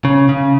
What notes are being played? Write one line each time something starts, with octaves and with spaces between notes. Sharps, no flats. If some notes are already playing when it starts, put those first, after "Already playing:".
C#3
C#3